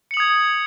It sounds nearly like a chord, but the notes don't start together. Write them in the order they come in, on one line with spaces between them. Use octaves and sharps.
C#7 F#7 D#6 G#6